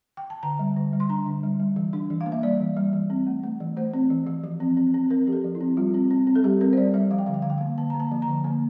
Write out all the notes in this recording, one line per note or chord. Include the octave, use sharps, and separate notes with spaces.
G5
A5
D3 A#5
G3
D3
G3
C6
D4 A#5
D3
G3
G3
E3
D4
E3
F5
A#3
E5
G3 D5
E3
G3
E3
C4
A3
A3
E3
A3 C5
C4
E3
E3
F3
C4
C4
C4
C4 A#4
F3 G4
A4
F3
E4
C4
G3 F4
C4
C4
C4
A4
G3 G4
C4 A#4
C5
G3 D5
G3 E5
F3 F5
G5
D3 F5
G5
D3 F5
G5
F5
A#3
D3 A5
A#3 A#5
A5
F3
A#5
D3
A#3